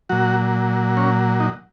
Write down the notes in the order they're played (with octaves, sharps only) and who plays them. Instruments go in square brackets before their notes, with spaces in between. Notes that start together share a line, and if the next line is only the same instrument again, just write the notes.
[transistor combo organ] A#2 F#3 F#4
C#4
D#4